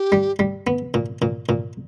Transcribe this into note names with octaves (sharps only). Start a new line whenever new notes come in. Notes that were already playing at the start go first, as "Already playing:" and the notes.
Already playing: G4
G3
G3
B3
A#2
A#2
A#2